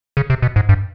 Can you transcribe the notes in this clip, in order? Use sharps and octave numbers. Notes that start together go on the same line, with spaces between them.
C#3
C3
B2
G#2
G2